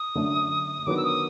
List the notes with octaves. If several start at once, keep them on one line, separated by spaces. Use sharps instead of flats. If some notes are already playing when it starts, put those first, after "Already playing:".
Already playing: D#6
F#2 D3 F#3 A3 D4
D#3 F#3 B3 D4 F#4 D6
E6
D#6